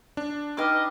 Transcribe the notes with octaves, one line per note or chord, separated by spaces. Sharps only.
D4
D#4 B4 D#5 G5 D6 F6